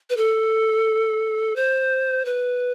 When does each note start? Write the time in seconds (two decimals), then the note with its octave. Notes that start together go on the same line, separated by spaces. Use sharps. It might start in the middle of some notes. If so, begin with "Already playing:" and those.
0.10 B4
0.17 A4
1.56 C5
2.25 B4